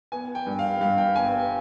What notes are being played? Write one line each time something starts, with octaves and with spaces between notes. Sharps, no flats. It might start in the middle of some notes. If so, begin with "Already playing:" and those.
B3 G#5
G5
G2
F5
G2 F5
G5
G1 G#5